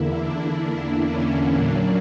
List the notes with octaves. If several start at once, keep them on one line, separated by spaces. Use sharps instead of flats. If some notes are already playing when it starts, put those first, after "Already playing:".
Already playing: E2 D3 A#3 E4
D4
C#4
A#2 F#3 A#3 D4